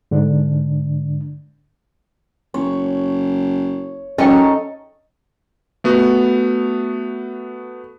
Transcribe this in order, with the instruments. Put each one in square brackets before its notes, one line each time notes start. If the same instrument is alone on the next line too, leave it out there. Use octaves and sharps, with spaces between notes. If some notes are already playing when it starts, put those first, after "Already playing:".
[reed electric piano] G#2 D3 D4
[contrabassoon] F#1 [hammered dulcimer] C#5
[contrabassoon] F#2 [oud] C#4 [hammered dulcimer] D#4 A4 [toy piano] D#5 G5
[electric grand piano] A3 B3 F#4